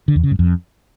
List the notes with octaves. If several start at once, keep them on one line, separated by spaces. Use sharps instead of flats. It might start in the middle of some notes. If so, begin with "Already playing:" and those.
D3
E2
C#3
G2
F2